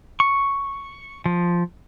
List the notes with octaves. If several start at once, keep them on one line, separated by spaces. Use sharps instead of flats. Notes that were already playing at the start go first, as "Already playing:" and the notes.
C#6
F3